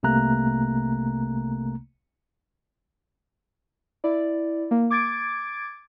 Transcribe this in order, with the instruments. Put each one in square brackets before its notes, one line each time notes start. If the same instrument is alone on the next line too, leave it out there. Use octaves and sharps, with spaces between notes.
[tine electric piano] C2 C3 A3 A#3 A#5 F#6
[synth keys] E4 D5
A#3
D6 G#6 A6 D7